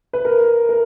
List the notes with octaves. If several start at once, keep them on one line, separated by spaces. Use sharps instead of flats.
B4
A#4
A#4